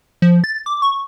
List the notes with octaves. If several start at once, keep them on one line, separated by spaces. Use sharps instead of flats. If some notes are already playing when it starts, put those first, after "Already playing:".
F3
A6
D6
C#6